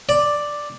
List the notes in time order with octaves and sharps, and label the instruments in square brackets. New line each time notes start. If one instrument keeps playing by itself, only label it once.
[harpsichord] D5